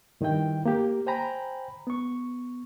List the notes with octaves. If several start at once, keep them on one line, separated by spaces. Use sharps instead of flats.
G2 D#3 D#4 E4 G5
A#3 G4
C5 G5 G#5 A#5 B5
B3 C#6